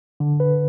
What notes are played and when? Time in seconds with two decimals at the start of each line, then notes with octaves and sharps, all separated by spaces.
0.20 D3
0.40 B4